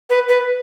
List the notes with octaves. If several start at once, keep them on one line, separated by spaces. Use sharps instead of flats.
B4
B4